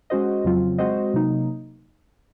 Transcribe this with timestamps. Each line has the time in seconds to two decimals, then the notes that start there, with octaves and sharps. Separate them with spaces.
0.10 G#3 C#4 F#4 C5 D#5
0.44 F2 C#3 F#3 C4 F4
0.78 G#3 C4 F#4 C5 D#5
1.14 C3 F#3 A#3 D#4